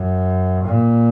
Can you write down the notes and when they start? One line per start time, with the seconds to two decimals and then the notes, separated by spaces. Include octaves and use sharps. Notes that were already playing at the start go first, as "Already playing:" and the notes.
Already playing: F#2
0.65 A#2